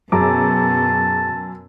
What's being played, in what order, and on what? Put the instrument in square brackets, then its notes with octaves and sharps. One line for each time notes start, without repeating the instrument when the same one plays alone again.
[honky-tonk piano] F#2 [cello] B2 [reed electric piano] G#4 A#5 D6 [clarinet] A5